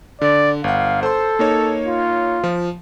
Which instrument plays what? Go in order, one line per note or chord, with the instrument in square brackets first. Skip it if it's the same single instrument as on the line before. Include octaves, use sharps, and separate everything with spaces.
[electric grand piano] D3 [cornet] D5
[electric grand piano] G1 F#5 [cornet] F5
[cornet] A4 [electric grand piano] C5 C6
[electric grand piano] A#3 D#4 C#5
[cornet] F4
[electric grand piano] F3